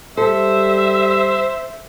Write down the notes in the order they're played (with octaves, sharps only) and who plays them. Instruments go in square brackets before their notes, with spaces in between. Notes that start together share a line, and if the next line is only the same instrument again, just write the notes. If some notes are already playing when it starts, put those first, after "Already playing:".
[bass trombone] G3 [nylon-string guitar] A4 [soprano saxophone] C5 [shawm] E5